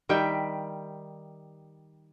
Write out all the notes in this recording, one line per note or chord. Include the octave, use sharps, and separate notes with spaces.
D#3 G3 E5 G5